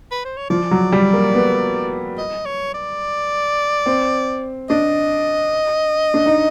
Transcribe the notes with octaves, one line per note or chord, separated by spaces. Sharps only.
B4
C5
C#5
F3 D5
F#3
G3
A#3
B3
D#5
C#5
D5
C4
D4 D#5
D4
D#4